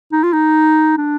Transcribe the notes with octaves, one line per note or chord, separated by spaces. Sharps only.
D#4
F4
D#4
D4